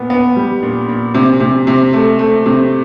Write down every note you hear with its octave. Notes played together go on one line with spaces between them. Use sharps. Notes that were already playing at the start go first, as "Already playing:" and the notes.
Already playing: A#2 B3
B3
G3
A#2
A#2
C3
C3
C3
A3
A3
C3